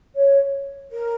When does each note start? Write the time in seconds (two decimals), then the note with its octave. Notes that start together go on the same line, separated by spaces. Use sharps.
0.16 C#5
0.91 A#4